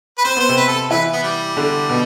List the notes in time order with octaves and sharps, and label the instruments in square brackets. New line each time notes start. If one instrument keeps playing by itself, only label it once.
[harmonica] B4
[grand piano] C4 [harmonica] C5
[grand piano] B3 [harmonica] C5
[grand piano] C3 C4
[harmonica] B4
A4
[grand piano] E3 E4 [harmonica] B4
[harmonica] B3
G3
[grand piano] D3 D4
B2 B3